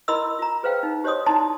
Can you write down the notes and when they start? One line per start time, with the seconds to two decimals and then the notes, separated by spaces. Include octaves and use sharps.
0.08 E4 A#4 D#5 B5 C6 E6
0.39 F4 A#5
0.63 G#4 B4 C5 F5 G5
0.83 D#4
1.04 G4 C5 C#5 D#5 C6 D#6
1.26 D#4 E4 D5 G#5 A5 C6